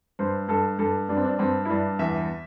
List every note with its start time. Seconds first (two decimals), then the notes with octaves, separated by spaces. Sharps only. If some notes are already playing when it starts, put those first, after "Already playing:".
0.19 G2 C5
0.48 G2 A4
0.79 G2 A4
1.09 G2 D4
1.17 C4
1.24 D4
1.39 G2 C4
1.65 E4
1.70 G2 D4
1.99 E2 E5